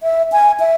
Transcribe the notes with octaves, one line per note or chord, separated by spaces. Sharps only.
E5
G#5
E5